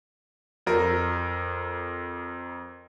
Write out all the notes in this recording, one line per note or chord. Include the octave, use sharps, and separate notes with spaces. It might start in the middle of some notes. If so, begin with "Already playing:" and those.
F2 A#4